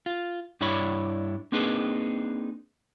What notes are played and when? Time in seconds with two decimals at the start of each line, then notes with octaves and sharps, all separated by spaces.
0.06 F4
0.61 G2 D4 E4 C#5 B5
1.52 A#3 C4 D4 D#4 G#4 B4